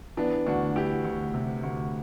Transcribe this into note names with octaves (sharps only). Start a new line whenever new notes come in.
E3 B3 D4
D2 D4 F#4
E3 E4 G4
D2
C3
D2